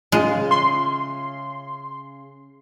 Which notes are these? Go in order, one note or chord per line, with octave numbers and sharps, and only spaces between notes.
C#3 G#3 F4
E5 B5 C6